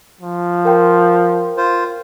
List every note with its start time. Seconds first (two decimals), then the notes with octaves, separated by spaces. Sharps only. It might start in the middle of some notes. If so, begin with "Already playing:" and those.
0.21 F3
0.65 A#4 G5 C6
1.57 F4 C5